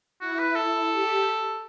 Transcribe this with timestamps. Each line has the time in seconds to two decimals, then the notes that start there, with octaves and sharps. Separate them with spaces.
0.21 E4 F#4
0.39 B4
0.56 A4
0.91 G4